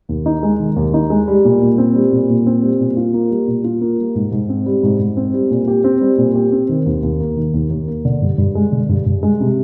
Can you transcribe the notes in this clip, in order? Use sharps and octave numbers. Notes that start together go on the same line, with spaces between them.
D#2
D#4
G#3
D#3
D#2
D#4
G#3
G3
A#2
A#2
C4
G3
A#2
A#2
C4
G3
A#2
F4
A#3
G3
A#2
F4
A#3
G3
G#2
G#2
C4
G3
G#2
G#2
C4
G3
A#2
G4
C4
G3
A#2
G4
C4
D#3
D#2
D#2
A#3
D#3
D#2
D#2
A#3
D3
G2
G2
G#3
D3
G2
G2
G#3
C3